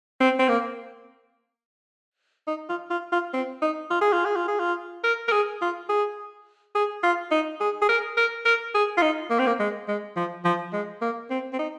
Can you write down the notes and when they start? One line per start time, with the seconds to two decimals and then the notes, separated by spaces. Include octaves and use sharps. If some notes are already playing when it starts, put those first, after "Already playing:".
0.20 C4
0.39 C4
0.49 A#3
2.47 D#4
2.69 F4
2.90 F4
3.12 F4
3.34 C4
3.62 D#4
3.90 F4
4.01 G#4
4.13 F4
4.25 G#4
4.36 F4
4.48 G#4
4.59 F4
5.04 A#4
5.28 A#4
5.32 G#4
5.62 F4
5.89 G#4
6.75 G#4
7.03 F4
7.31 D#4
7.60 G#4
7.82 G#4
7.89 A#4
8.17 A#4
8.45 A#4
8.74 G#4
8.97 F4
9.02 D#4
9.30 A#3
9.39 C4
9.47 A#3
9.59 G#3
9.88 G#3
10.16 F3
10.45 F3
10.73 G#3
11.01 A#3
11.30 C4
11.53 C4
11.59 D#4